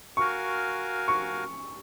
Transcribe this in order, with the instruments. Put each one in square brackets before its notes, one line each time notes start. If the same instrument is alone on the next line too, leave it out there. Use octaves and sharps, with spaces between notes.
[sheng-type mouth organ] F#4 A#4 F5 G#5 [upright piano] C#6
[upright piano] C#6